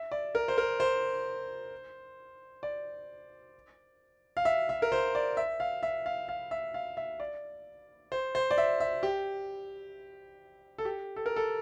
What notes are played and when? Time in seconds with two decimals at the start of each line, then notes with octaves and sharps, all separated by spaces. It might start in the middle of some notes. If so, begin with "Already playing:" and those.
Already playing: E5
0.12 D5
0.35 A#4
0.48 C5
0.58 A#4
0.80 C5
2.63 D5
4.37 F5
4.45 E5
4.69 E5
4.82 A#4
4.92 C5
5.15 D5
5.37 E5
5.60 F5
5.83 E5
6.06 F5
6.29 F5
6.51 E5
6.74 F5
6.97 E5
7.20 D5
8.12 C5
8.35 C5
8.51 D5
8.58 E5
8.80 E5
9.03 G4
10.78 A4
10.85 G4
11.16 A4
11.26 A#4
11.36 A4